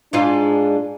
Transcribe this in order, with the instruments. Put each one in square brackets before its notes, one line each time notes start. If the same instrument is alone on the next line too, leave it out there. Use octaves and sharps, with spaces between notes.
[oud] G#2 G#3 F4 [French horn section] D4